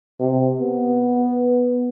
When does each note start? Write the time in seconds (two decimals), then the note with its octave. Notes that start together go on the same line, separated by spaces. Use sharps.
0.20 C3
0.60 B3